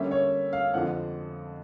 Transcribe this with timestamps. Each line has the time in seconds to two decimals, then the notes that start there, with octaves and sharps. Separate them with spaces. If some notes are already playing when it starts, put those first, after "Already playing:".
Already playing: D3 G3 A#3 C#4 E5
0.11 C#5
0.53 F5
0.73 F2 D3 F3 G#3 C4 F#5